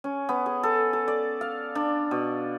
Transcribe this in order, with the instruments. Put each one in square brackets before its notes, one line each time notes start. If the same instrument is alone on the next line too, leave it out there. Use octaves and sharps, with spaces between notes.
[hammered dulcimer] C#4
B3
G#4
A4
A4
D5
F5
D4
B2